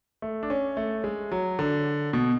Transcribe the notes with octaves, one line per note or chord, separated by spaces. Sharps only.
A3
D4
C#4
A3
G#3
F#3
D3
B2